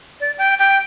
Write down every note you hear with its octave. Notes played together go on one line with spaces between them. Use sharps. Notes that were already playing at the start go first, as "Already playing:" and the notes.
D5
G5
G5